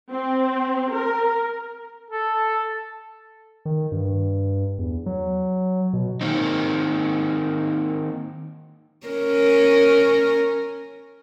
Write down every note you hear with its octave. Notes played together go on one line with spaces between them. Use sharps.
C4
A#4
A4
D#3
G2
E2
F#3
B2
D#3 A#3 C4 D#4
C#4 A#4